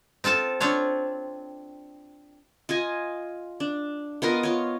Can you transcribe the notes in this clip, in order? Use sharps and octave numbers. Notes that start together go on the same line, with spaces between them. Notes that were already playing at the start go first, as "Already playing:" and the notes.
C4 F4 A4 A5
C4 D4 F4 C#5
F4 D#5 G#5
D4
B3 F4 A#4 D#5
F4 C#5